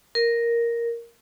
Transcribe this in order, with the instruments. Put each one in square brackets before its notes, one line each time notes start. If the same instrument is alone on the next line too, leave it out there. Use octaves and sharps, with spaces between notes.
[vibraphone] A#4